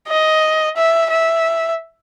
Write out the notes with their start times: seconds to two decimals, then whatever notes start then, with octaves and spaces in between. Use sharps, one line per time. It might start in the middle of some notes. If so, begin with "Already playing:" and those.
0.08 D#5
0.76 E5
1.10 E5